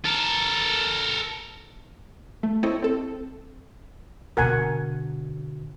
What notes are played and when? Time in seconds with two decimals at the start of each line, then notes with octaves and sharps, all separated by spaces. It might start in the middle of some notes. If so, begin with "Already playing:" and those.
0.06 A4 A#4
2.43 A3
2.63 C4 E4 A4 C#5 D#5
2.82 C4 A4
4.37 B2 D3 A#4 F#5 G#5